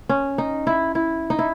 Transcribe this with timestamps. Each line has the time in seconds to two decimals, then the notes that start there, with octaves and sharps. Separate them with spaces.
0.09 C#4
0.38 D#4
0.67 E4
0.95 E4
1.30 D#4
1.39 E4